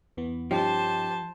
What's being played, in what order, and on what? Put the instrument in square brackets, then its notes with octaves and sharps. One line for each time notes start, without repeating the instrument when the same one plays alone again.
[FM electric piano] E2 E3 B3
[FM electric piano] G2 C#4 D#4 [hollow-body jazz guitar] F3 [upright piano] G4 [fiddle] C5 A5